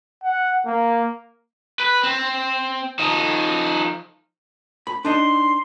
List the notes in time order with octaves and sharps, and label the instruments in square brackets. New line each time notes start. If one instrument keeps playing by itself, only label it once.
[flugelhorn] F#5
A#3
[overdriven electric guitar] B4
C4
F3 D#4
[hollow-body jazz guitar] B5
[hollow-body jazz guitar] D4 D#4 D#5 [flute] C6